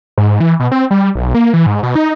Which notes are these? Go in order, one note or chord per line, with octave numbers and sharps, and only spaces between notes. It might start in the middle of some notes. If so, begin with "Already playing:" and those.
G#2
E3
B2
C4
G3
B1
A#3
E3
G#2
B2
D#4